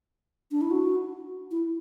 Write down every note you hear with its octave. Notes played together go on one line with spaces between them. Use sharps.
D4
E4
F#4
E4